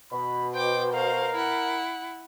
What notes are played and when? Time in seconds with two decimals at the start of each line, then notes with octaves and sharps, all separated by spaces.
0.12 B2 B5
0.54 C5 G5 D6
0.92 A#4 C5 F5
1.34 E4 F#5